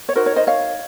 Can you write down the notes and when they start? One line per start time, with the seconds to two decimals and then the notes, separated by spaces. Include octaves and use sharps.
0.09 C#5
0.16 D#4 F#4 A#4 C5
0.26 C#5
0.36 C5 D#5
0.47 C#5 F5